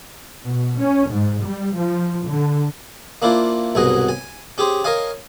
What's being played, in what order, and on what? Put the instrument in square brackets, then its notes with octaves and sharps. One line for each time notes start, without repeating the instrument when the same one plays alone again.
[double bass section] B2
C#4
G#2
G3
F3
D3
[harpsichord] A#3 D4 E4 F4 C5
C2 G#2 B2 F#3 G#4 D#5
G#5
C#4 G4 G#4 C5
A#4 C#5 D#5 F5 G#5